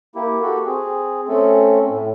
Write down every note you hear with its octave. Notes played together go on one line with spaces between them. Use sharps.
A#3 E4 G4
F#4 G4 A4
C4 G#4
A3 C4 C#4 A4
A2